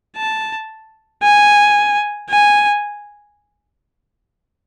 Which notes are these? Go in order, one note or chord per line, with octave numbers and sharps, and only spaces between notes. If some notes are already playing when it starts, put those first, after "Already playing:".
A5
G#5
G#5